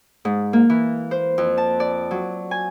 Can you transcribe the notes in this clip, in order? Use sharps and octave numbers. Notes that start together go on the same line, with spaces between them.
G#2
A#3
E3
C5
F2
A5
D5
F#3
G#5